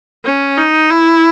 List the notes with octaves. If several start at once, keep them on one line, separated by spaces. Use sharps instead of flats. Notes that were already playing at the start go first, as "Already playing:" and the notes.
C#4
D#4
E4